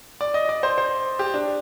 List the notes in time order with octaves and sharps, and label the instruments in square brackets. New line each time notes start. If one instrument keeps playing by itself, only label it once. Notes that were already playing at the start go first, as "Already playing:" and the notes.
[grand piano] D5
D#5
D5
C5
C5
G4
D4